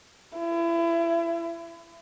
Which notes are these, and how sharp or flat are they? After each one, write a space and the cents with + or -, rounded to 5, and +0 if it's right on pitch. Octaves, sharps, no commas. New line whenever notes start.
E4 +30